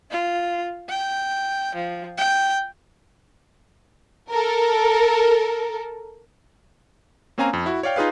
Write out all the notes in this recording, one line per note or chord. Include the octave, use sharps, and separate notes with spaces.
F4
G5
F3
G5
A4 A#4
A#3 C4 C#4 F5 G#5 A#5
F2
E4 F#4
C#5 D5 F5 G5
D#4 F4 G#4 B4 F5